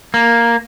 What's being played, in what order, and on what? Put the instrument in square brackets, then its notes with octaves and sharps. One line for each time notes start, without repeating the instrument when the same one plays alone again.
[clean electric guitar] A#3